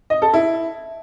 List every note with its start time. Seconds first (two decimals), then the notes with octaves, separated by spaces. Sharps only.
0.10 D#5
0.22 A4
0.33 E4